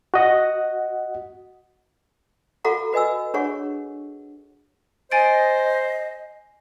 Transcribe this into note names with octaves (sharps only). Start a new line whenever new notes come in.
F#4 D#5 F#5
F#4 A4 F5 F#5 A#5 C#6
F#4 B4 D#5 G#5 E6
D4 G#4 C#5 F#5 C#6
C5 D#5 G#5 A6 D7